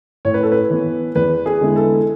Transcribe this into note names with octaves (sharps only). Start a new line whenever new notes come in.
A2 C#5
B4
A4
B4
E3 B3
E2 B4
G#4
D3 G#3 B3 E4
A4